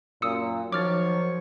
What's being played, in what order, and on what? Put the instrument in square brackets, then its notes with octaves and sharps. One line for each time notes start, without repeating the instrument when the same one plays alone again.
[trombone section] F#2 A#2 [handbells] D#6 E6 C#7
[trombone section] D#3 F#3 [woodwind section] F3 C#5 [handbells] D6 F6 A6